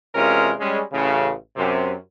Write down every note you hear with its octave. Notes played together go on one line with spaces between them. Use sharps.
E2 C3 G#3 C#4 F4 A#4
G3 G#3 C#4
A1 C#3
F#2 C3